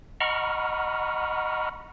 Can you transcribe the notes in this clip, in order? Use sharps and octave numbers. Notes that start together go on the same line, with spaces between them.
D#5 F#5 A#5 B5 C#6 F6